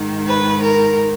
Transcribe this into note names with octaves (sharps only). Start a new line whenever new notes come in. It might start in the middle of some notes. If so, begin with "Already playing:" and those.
Already playing: G#2 D#3
B4
A#4